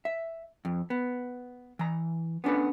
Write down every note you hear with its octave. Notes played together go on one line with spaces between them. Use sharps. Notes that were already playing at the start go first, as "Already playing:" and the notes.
E5
F2
B3
E3 A#5
B3 C#4 D4 A4 B4